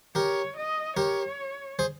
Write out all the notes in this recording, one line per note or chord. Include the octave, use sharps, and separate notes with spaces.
G4 A#4 C#5
D#5
G4 A#4 C#5
G#4 C5